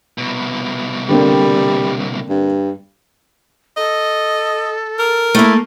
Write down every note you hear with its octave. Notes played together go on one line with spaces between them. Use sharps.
C2 B2
D3 G3 A#3 C4
G2
A4 D#5
A#4
A3 A#3 E4